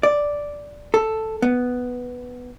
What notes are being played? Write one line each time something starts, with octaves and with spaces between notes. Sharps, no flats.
D5
A4
B3